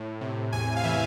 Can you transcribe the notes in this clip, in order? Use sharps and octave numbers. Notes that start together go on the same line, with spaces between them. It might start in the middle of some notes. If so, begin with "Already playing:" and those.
Already playing: A2
C3
E2 G#5
F5
E3 E5